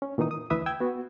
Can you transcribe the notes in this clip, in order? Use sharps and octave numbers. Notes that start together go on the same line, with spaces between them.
C#4
A#2 D#3 E3 D#4 D#6
D#6
D2 E3 B4 E5 D#6
G5 E6 G#6
B3 F#4